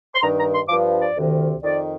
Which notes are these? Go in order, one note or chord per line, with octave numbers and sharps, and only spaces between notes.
C6
G2 D#3 A#5
A#5
C6
G2 F3 D6
D5
D2 C3 D#3
F2 D#3 D5